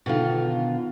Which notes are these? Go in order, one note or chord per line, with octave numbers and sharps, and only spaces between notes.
B2 D3 D#3 F4